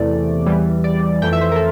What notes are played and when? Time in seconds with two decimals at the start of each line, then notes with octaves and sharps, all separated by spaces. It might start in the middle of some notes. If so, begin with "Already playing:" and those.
Already playing: E2 C3 E3 A3 D5
0.46 E2 E3 G3
0.84 D5
1.22 F2 E3 A3 G5
1.33 E5
1.41 C5
1.52 A#4
1.56 A4